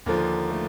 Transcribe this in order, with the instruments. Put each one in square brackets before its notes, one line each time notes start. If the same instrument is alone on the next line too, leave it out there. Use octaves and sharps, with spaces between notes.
[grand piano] D#2 D3 F3 A#3
A3